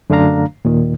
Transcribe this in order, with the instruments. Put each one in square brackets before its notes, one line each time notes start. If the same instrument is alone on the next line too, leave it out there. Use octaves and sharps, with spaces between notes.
[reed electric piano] F#2 D3 A3 D4 F5 A#5
D#2 A#2 D#3